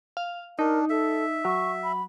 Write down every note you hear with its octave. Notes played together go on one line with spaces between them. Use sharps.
F5
D4 D#4 A#4
A4 E5
F#3 C#6
B5